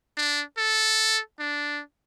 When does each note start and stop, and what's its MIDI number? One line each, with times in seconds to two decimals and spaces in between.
0.17 0.43 62
0.58 1.20 69
1.39 1.82 62